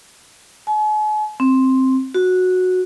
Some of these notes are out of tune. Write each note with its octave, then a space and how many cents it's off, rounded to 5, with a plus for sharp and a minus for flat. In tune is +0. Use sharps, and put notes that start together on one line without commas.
G#5 +45
C4 +5
F#4 -10